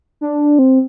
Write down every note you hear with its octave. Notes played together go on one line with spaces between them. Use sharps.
D4
C4